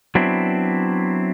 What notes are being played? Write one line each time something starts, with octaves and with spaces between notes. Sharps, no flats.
F#3 B3 C4 D4 E4